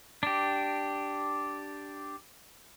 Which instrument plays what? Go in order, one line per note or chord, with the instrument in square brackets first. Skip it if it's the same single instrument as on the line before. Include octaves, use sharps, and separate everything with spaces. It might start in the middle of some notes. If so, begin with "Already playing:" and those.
[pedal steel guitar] D4 G4